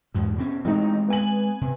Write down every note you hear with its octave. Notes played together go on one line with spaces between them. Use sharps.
E2 G#2 B2
B2 C4 C#4
A1 G#3 C4 D#4
B3 G#5 F#7
C3